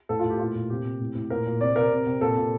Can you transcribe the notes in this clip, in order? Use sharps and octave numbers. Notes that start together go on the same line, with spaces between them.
A2 A4
F4
A2
G4
A#2 F4
A#2
C3 G4
C3
A2
A2
A#2 A#4
A#2
C3 D5
C3 A#4
C3
C3
A#2 A4
A#2